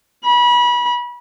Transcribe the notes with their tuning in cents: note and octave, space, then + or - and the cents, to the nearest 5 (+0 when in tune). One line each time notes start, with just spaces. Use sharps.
B5 -30